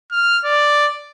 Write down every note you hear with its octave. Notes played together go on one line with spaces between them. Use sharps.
F6
D5